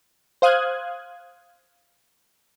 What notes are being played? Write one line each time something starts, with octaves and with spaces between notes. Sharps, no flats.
C5 F5 D#6 F#6 G#6